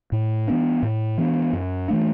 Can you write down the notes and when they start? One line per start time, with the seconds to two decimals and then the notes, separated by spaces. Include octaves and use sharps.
0.12 A2
0.47 E3 B3 D4
0.82 A2
1.18 E3 B3 D4
1.53 F#2
1.88 E3 A3 D4